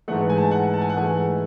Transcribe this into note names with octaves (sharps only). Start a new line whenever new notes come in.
G#2 E3 A3 F#5
G#5
A5
G#5
F#5
A5
G#5
F#5
G#2 E3 A3 G#5